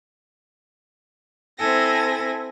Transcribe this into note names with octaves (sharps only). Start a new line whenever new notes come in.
C4 E4 A4 G#5 A#6